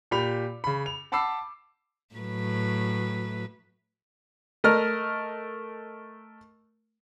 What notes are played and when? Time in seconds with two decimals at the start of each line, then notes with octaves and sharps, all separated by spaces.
0.11 A#2 G4 B5 F7
0.64 C#3 B5
0.86 F7
1.12 F#5 A5 B5 D6 E6 C7
2.15 A2 F#3 B4
4.64 A3 A#4 D#5 F6